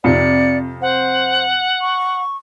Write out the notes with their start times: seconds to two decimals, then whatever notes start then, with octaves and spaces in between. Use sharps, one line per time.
0.04 F2 C3 D5 C#7
0.81 C5 F#5
1.81 C#6